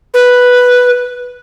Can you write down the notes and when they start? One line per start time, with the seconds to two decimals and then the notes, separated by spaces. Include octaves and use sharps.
0.14 B4